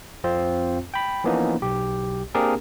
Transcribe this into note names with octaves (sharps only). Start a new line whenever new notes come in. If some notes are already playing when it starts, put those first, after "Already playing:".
F2 C4 F4 C5
G5 B5
E3 F3 A#3 B3 C#4 D#4
B1 G4
A#3 C4 D4 G4 G#4 A#4